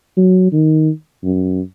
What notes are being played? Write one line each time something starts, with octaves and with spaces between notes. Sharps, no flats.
F#3
D#3
F#2